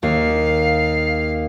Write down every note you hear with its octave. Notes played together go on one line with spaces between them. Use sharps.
D#2 F5